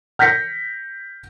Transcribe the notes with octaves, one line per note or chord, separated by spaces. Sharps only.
F6 G6 A#6 B6 C#7